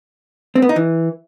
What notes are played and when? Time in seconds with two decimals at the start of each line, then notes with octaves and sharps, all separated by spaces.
0.55 C4
0.62 B3
0.69 D#4
0.76 E3